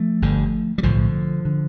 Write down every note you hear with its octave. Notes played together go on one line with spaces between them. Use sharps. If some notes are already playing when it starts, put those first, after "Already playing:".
Already playing: F3 A3
G1 G2 D3
G3
B1 A2 D3 F3
D3